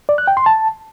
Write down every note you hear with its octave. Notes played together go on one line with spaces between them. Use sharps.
D5
F#6
G5
C6
A5